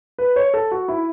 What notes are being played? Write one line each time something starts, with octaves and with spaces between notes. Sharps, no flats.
B4
C#5
A4
F#4
E4